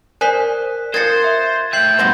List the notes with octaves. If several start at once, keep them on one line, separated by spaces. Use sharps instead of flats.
A#4 C5 D5 G#5 F#6 B6
F3 C4 A#4 C5 G#6 A6 C#7
E5
A2 E5 G5 G6 C7 F#7
G2 B2 C4 F#4 C5